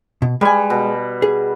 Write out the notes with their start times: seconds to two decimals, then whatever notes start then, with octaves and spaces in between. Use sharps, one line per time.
0.22 B2
0.41 G3 G#3 B4 G#5
0.70 B2
1.22 G#4